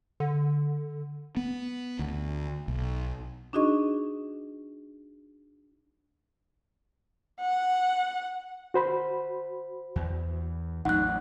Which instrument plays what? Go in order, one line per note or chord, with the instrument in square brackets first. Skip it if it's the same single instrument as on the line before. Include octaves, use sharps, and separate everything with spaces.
[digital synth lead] D3
[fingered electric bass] B3
D2
B1
[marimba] D4 D#4 F#4 G#4 D#5 C#6
[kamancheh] F#5
[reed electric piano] F#4 C5 B5
[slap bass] E2
[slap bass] A1 F#3 [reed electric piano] D#4 [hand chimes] F#5 F#6